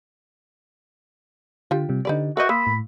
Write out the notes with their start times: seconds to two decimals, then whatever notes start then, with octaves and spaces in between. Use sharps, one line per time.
1.71 D3 F4 G4
1.89 C3 G3
2.05 D3 D#4 G4 B4 D5
2.37 F#4 A#4 B4 D#5 E5 G6
2.49 A#3 B5 C6 D#6 E6
2.67 A2